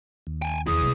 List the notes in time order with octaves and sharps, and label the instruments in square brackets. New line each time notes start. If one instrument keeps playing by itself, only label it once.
[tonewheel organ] D#2
[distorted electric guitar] G5 G#5
[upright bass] E2 [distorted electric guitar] E4 G#4 [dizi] D#6
[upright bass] C3 G#3